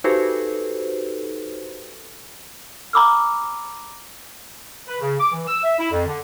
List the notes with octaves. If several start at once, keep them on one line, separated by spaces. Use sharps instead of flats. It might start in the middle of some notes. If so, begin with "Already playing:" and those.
D#4 F#4 G4 A4 B4 C5
A#5 B5 D6 E6 F6
B4
C#3
D6
E3
E6
E5
E4
F2
D3